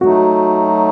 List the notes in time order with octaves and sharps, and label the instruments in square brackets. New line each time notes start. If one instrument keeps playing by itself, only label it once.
[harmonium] F#3 A3 D#4 [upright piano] F#4